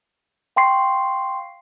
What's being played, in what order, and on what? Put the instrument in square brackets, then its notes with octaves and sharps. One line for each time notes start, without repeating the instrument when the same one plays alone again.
[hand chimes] F5 G5 C6 C#6 C7